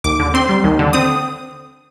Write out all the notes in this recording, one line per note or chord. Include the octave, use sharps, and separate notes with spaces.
D#2 D6
D3
C4 C6
G3
D#2
D3
C4 D#6